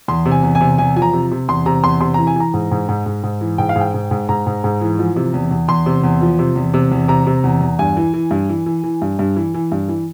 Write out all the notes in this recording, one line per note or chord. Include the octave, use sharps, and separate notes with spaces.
E2 C6
C3
G#5
E2
G#5
C3
E2 G#5
F3 G#5
A#5
C3
C3
E2 C6
C3 A#5
E2 C6
C3 C6
E3 A#5
G#5
E3 A#5
G#2
G#2
G#2
G#2
G#2
E3
G#2 G5
F5
G#2
G5
G#2
G#2
G#2 A#5
G#2
G#2
E3
F3
C3
E2
E2
E2 C6
C3
E2
F3
C3
E2
C3
E2
C3 A#5
C3
E2
E2
G2 G#5
E3
E3
G2
E3
E3
E3
G2
G2
E3
E3
G2
E3